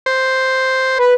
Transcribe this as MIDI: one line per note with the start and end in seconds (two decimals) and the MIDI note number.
0.06 0.98 72
0.99 1.14 71